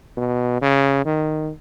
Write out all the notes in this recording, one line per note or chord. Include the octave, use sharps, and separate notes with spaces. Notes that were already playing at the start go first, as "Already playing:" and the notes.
B2
C#3
D#3